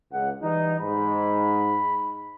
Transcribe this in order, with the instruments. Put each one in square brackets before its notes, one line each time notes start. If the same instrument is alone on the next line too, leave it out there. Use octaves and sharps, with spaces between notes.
[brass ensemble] C#2 F#5
E3 G3 D#4
[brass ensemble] G#2 [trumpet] B5